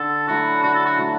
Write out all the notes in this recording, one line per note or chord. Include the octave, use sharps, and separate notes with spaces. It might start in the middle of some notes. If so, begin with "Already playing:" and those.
Already playing: D3 A4
F#3 A3 E4 F#4
D3 F#4
A4
F#4
F#3 A3 E4